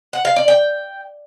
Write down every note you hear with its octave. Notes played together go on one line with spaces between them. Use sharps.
F#5
F5
D5
G5